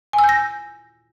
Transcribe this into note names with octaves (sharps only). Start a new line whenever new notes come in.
G#5
E6
G6
A#6